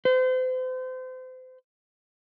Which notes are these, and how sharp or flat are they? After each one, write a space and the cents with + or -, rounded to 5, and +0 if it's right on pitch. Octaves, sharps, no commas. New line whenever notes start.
C5 -35